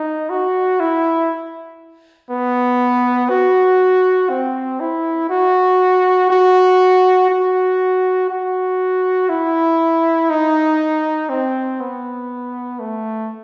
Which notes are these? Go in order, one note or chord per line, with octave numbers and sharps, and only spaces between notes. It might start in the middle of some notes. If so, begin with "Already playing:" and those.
Already playing: D#4
F#4
E4
B3
F#4
C4
E4
F#4
F#4
F#4
F#4
E4
D#4
C4
B3
A3